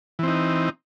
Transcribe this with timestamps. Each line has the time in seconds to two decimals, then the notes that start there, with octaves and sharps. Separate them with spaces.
0.19 E3
0.23 C4
0.28 D#4